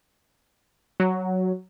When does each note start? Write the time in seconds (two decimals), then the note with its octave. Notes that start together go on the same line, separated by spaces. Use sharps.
1.00 F#3